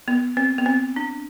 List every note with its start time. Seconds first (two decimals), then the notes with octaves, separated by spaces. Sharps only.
0.08 B3
0.37 C4
0.58 B3
0.66 C4
0.96 D4